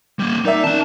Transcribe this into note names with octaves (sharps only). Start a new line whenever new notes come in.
G3 A#3
D#4 A#4 D5 E5
D#3 C#4 A5